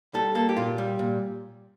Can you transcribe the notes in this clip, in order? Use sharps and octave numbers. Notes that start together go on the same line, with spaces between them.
G3 A4
A#3 A4
G4
A#2 F4
G3
A#2